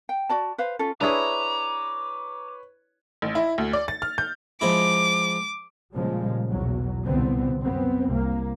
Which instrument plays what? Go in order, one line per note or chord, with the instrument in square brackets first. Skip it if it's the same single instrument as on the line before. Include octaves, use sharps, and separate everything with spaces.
[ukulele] G5
F#4 D5 A5
B4 C5 F5
C#4 F4 A4
[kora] D4 E4 G#4 [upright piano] B4 C#5 [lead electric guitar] A#5 [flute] D6
[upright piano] A1
E4
D2
D5
A6
F6
G6
[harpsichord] F3 G#3 E4 [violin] D6
[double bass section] A#2 C#3 F3 G3 G#3
B1 E2 F#3
C2 A#2 D3 B3 C4
F#2 B3 C4
C2 A#3